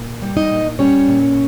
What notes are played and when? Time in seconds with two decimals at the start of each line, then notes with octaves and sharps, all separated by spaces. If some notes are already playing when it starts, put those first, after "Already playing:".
Already playing: A#2
0.22 G3
0.37 D#4 D#5
0.50 A#2
0.79 G3 C#4 C#5
1.08 A#2